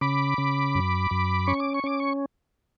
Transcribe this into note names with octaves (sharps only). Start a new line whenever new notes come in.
C#3 B5 D6
C#3
F#2
F#2
C#4 C#6
D6
C#6
C#4 D6
C#6